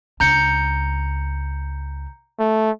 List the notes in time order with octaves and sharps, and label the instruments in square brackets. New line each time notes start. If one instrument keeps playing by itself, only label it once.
[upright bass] C#2 D4 [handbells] A#5 G6 C#7
[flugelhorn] A3